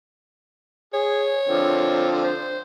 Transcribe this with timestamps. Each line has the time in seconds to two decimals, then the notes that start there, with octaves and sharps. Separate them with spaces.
0.94 G#4 C#5
1.48 D3 F3 C4
2.24 C5